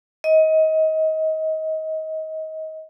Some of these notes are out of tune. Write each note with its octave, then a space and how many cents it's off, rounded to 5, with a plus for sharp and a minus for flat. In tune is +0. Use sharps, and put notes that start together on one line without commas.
D#5 +25